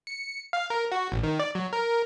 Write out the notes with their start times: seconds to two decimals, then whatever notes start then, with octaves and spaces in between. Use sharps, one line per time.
0.07 C#7
0.53 F5
0.70 A#4
0.92 F#4
1.12 A1
1.23 D#3
1.39 D5
1.55 F#3
1.73 A#4